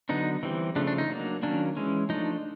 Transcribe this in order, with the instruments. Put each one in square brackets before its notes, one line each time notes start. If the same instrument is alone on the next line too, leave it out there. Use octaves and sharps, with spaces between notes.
[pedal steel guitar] D3 F#3 B3 D4 D#4
E3 G3 C4
C#3 F3 A3 D4
D4
D#4
F#3 A#3 D4
D#3 F#3 A#3 C#4 D4
E3 G#3 C#4
F3 A3 D4 D#4